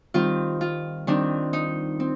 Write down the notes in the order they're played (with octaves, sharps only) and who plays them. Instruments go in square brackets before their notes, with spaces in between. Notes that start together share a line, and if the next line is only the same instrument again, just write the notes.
[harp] D#3 G3 C4 F4
F4
D#3 G3 C4 D4
D#4
C4